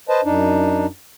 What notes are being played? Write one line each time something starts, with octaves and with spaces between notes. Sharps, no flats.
B4 C5 D#5 A5
F#2 D4 D#4